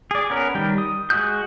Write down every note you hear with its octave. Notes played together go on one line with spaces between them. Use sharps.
G#4 D5
B3 C#4 A#4
D#3 G3 G5
D#6
G#3 F#4 D#6 G6